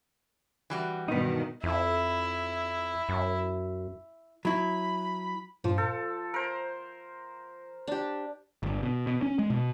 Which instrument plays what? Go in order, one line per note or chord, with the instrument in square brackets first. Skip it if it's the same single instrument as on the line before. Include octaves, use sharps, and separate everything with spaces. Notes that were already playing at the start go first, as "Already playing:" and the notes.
[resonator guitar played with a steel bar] E3 G3 F#4
[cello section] G2 B2 D#3 [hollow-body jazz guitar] B3 D#4
[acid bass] F2 [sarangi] E4
[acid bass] F#2
[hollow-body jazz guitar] F#3 E4 [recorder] B5
[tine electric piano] G2 A#2 [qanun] F3
[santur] A4 [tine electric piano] G6
[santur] A#4 C5
[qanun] D4 G4
[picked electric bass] G1
B2
B2
C#4
G#3
B2